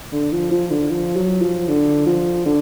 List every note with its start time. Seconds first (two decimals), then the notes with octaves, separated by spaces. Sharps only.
0.12 D3
0.32 F3
0.51 F3
0.70 D3
0.90 F3
1.16 F#3
1.42 F3
1.68 D3
2.06 F3
2.46 D3